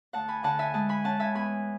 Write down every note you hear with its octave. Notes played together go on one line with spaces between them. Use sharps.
D2 F#5 A5
G#5 B5
D3 F#5 A5
E5 G#5
G#3 F#5 A5
G#5 B5
C#4 F#5 A5
E5 G#5
E2 G#5 B5